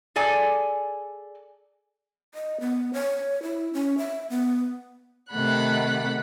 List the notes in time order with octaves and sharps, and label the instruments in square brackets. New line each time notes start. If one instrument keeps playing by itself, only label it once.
[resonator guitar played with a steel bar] G#4 A4 D5 G#5
[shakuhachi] D#5
B3
C#5
E4
C#4
E5
B3
[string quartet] C3 D#3 A3 F#5 B5 F#6